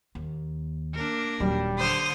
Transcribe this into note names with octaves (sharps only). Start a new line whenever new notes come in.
D#2
A#3 D4 A#4
D#1 F#3 G3
D3 C5 D#6 F6